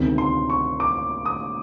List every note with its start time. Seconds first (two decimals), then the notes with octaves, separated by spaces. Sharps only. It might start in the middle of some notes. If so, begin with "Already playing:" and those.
Already playing: D2 C3 D#3 G#3 B3
0.18 C6
0.50 C#6
0.80 D6
1.26 D#6